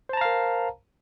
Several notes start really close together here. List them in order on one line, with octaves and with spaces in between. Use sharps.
C5 A5 A#5 F5 A#4